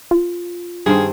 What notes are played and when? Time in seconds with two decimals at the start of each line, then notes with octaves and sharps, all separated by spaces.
0.11 F4
0.86 G2 D#3 C4 G#4